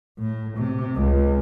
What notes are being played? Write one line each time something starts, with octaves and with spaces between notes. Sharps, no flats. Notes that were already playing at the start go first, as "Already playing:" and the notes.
A2
C3
C#2